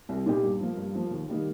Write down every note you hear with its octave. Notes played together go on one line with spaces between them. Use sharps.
C2
A#2 G3 D#4 G4
G2
F3 A#3
G2
F3 A#3
D#2
D#3 G3 A#3 D#4